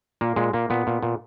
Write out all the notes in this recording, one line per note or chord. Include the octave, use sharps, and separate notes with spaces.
A#2 A#3
A#2 G#3
A#2 A#3
A#2 B3
A#2
A#2